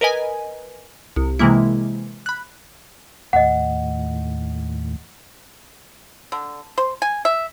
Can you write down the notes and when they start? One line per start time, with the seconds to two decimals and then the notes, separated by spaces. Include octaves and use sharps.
0.01 A#4 B4 D#5 G#5
1.16 C2
1.39 C3 E3 G#3 A#3 E4
2.26 B5 F#6
3.33 D#2 A2 D#5 F#5
6.32 D3
6.78 C5
7.02 G#5
7.25 E5